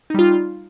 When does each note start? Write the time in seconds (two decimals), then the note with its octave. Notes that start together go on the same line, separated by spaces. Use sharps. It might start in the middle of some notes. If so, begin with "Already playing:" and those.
0.10 D#4
0.14 G3
0.19 F4